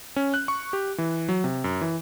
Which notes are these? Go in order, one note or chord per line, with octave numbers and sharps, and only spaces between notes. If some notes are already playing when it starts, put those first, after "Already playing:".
C#4
F#6
C#6
G4
E3
F#3
C3
F#2
E3